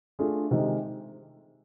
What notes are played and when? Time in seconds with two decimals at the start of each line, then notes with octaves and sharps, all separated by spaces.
0.19 A3 D4 F4 G#4
0.51 C3 D#3 G#3